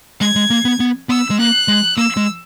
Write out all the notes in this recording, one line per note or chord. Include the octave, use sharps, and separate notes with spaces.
G#3 G#6
G#3
A#3
B3
B3
B3 E6
G#3
A#3 F#6
G#3
A#3 E6
G#3